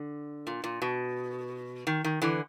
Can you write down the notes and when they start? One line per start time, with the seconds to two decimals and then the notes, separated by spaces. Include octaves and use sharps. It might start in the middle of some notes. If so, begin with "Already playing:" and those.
Already playing: D3
0.47 A#2
0.64 A#2
0.82 B2
1.87 D#3
2.04 D#3
2.22 D3 E3